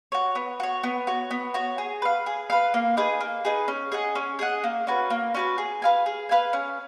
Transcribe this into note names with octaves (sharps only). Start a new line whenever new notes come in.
F#4 C#5
B3
F#4 C#5
B3
F#4 C#5
B3
F#4 C#5
G#4
B4 F5
G#4
B4 F5
A#3
D#4 G#4 B4
A#3
D#4 G#4 B4
C#4
G#4 D#5 F#5
C#4
G#4 D#5 F#5
A#3
C#4 F#4 B4
A#3
C#4 F#4 B4
G#4
B4 F5 G#5
G#4
B4 F5 G#5
C#4